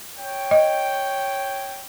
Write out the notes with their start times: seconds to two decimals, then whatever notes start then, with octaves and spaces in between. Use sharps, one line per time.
0.18 C#5 G5
0.51 D#5